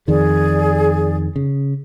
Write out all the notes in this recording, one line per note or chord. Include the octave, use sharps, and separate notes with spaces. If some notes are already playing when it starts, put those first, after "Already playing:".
F2 D#3 G#4 D5
C#3